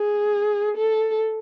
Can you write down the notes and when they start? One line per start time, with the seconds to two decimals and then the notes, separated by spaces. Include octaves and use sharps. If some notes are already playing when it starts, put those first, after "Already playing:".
Already playing: G#4
0.77 A4